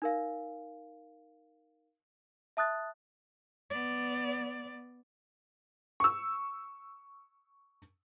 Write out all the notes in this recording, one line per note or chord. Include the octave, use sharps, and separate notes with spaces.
D#4 A#4 F5
E5 A5 D#6 F#6 A6
B3 D5
C#6 E6